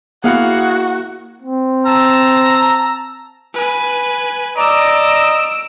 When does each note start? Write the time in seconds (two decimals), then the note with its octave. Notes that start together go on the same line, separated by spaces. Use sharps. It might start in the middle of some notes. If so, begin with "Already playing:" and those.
0.24 A#3 E4 F#4 G#4 F5 F#5
1.42 C4
1.86 A5 A#5 E6
3.54 B4 G#5
4.57 D5 D#5 A#5 E6 D7